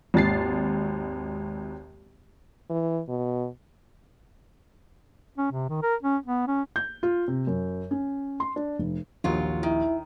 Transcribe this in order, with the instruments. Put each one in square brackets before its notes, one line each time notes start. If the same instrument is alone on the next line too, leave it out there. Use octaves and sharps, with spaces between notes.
[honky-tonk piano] G#1 D#2 A6 C7
[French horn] E3
B2
[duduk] C#4
C3
D#3
A#4
C#4
B3
C#4
[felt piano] G6
F4
C3
F#2
C#4
C6
D4
F1
[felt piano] A#1 D#2 [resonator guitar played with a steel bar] G#2 F#3 F4
[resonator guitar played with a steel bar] D#3 [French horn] E4